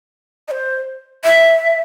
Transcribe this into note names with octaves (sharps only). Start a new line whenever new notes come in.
D#5
C5
E5